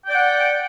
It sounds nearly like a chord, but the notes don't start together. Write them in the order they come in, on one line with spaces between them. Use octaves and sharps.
G5 D5 F#5